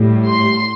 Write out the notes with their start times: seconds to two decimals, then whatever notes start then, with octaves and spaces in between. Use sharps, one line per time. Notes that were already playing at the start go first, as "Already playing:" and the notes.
Already playing: A2 G3
0.27 C6